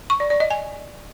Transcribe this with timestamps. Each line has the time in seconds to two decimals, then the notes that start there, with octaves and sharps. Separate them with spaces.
0.10 C#6
0.20 D5
0.30 D5
0.40 D#5
0.51 G#5